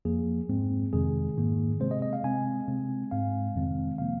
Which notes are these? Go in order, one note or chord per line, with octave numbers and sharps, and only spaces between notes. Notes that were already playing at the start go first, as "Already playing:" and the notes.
F2 F3 A#3 G#4
G#2 G#3 C4
F2 C3 D#3 G#3 G#4
G#2 D#3 A#3
C3 G#3 C4 C5
D#5
D#5
F5
C3 G#3 C4 G#5
C3 G#3 C4
G#2 G#3 C4 F5
F2 C3 D#3 G#3 C4
C3 F3 A#3 F5